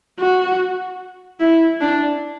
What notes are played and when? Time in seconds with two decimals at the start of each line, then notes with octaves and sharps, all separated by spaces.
0.19 F#4
1.40 E4
1.80 D4